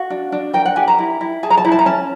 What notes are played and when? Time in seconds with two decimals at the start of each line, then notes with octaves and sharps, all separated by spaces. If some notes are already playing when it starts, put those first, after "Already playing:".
Already playing: F#4 F5
0.10 D4
0.32 D4
0.53 A#4 G5
0.65 F#5
0.76 G4 G#5
0.88 A#5
0.98 E4
1.21 E4
1.43 G#4 A5
1.50 A#5
1.57 A5
1.64 E4 A#5
1.72 A5
1.79 A#5
1.86 C#4 A5